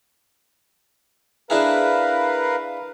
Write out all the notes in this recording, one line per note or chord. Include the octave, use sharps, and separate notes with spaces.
D4 E4 G#4 A#4 B4 F5